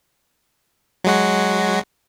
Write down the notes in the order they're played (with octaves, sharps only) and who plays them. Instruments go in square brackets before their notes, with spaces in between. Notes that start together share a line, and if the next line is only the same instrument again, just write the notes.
[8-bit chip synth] F#3 G#3 F#4